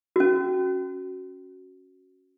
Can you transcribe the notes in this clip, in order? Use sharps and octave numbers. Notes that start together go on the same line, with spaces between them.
C#4 F#4